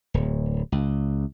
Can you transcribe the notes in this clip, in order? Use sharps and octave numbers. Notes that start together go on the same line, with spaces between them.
D1
C#2